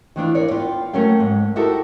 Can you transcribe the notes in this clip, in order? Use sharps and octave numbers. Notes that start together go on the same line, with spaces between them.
D#3 E3 D4 F4
A#4 C#5 D5
B3 F4 G5
F#3 A3 A#3 C#4 A#4 G5
G#2
D#4 E4 F#4 G4 A4 A#4